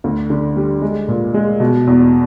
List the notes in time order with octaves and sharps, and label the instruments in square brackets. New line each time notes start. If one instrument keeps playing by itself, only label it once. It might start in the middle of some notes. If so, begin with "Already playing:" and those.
[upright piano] D2
D3
G3
G#3
A#2
G#3
B2
E2